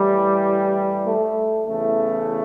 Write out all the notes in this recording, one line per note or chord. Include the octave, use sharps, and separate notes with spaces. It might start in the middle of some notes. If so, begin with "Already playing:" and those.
Already playing: A2 E3 G3
A3
E2 C#3 E3 A3